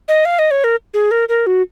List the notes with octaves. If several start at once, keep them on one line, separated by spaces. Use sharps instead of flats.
D#5
F5
D#5
C#5
A#4
G#4
A#4
A#4
F#4